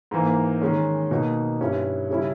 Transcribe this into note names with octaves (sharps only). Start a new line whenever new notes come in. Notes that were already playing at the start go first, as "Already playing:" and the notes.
G#2 E3 A#3
D#3 G#3 C#4
B2 A#3 D#4
G2 G3 C#4 E4
C#3 G3 C#4 E4